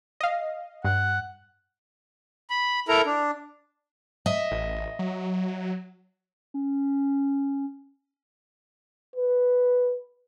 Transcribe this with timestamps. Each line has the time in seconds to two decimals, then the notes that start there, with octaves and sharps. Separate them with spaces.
0.21 D#5 F5
0.84 G2 F#5
2.50 B5
2.88 E4 A4 A#4 A#5
3.06 D4
4.26 D#5 E5
4.51 A1
4.99 F#3
6.54 C#4
9.16 B4